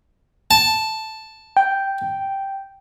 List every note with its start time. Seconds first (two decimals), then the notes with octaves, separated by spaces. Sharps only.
0.51 A5
1.57 G5